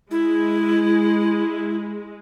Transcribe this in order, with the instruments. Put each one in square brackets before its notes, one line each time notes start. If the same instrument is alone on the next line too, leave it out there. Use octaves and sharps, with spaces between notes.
[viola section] G#3 [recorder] E4